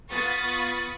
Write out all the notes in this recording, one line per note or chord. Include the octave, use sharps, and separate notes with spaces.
B3 F4 B5 C#6 D#6 A6